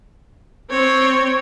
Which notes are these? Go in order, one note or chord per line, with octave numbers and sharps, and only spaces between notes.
C4 C#5